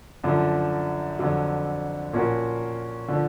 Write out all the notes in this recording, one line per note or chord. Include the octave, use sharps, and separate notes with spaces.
F#2 D3 F3
F2 D3 F#3
A#2 F3 A#3 C#4 F#4
D3 F3